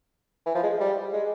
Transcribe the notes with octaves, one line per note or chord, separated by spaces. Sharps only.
E3
F3
G#3
G3
G#3